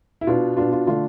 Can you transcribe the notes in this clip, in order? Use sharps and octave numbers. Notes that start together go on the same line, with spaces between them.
E4
B2 B3 D4 F4
B2 B3 D4 F4
F4
D3 A3 D4 F4